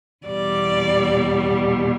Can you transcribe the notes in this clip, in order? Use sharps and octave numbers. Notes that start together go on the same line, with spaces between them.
E2 B2 G3 D5